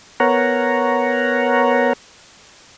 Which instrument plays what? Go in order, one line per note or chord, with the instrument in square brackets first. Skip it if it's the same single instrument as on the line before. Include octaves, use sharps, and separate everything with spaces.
[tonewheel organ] B3 A#4 C#5 F#5 A#5